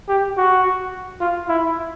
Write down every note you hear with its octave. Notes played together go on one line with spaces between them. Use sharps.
G4
F#4
F4
E4